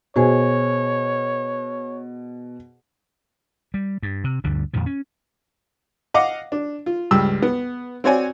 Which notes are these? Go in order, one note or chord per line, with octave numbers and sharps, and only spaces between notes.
B2 G#4 C5 C#5 G#5
G3
G2
C3
D2 G2 D3 G3
F2 A#2 D#3 F3
C#4
D#5 F5 F#5 D6
D4
F4
C#2 G2 G5 E6
B3
C4 F#4 C#5 D5 G#5